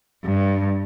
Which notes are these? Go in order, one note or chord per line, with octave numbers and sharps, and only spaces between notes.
G2